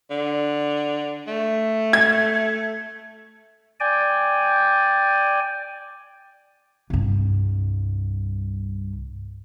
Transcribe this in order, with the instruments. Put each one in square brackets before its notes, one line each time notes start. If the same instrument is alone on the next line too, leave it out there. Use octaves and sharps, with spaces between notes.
[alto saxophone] D3
A3
[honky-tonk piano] G#6
[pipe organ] D5 G5 G#5
[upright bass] C2 G2